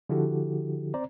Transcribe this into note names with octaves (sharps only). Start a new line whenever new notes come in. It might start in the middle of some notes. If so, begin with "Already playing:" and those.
D3 F3 E4 F#4 G4 A4
C4 C5 D5 A#5